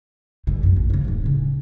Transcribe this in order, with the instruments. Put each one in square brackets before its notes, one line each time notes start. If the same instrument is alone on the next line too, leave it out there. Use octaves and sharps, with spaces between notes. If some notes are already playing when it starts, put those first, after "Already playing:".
[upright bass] G2 D3
B1 F#2
A#1
C#3 F3
D1 A2
C#3